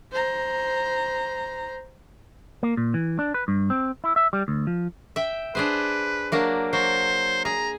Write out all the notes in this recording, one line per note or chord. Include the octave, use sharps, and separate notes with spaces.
C5 A#5
A#3
A#2
E3
D4
B4
G2
C4
E4
E5
G3
D2
F3
E5 G5
D4 G#4 B4 C5
F#3 A#3 D4
F#3 C5
G#4 A#5